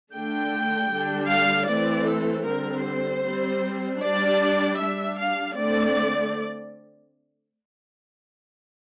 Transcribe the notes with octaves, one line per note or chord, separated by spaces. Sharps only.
D3 A3 D4 G5
D3 G3 D4
F5
E3 A3 C4 D5
A4
D3 G3 C4 A#4
C5
G3 C4
G3 D4 D5
G3 D4 E5
F5
D3 A3 C4 D5